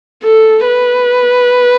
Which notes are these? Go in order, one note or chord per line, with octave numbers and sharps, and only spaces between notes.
A4
B4